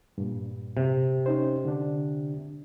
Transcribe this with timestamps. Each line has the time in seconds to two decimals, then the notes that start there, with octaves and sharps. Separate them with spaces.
0.18 G2 A#2
0.77 C3
1.26 C#4 D#4 C5
1.65 D3 D4